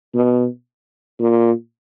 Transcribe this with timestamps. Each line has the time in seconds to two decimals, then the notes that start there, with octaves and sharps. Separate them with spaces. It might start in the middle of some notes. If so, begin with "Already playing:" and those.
0.15 B2
1.20 A#2